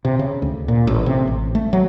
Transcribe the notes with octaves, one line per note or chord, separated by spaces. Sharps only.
C3
C#3
D2
A#2
A1
C3
A1
A3
F#3